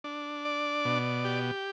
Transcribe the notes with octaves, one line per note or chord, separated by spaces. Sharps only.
D4
D5
B2
G4